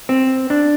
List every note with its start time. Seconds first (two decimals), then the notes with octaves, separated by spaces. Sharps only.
0.09 C4
0.50 D4